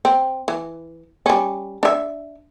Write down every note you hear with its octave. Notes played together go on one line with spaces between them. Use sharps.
C4
E3
G3 C#4
D4 E5